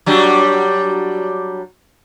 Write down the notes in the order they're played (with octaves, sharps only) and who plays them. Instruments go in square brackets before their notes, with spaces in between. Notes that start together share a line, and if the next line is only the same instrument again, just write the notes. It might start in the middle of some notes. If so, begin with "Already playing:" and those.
[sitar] F#3 G3 D4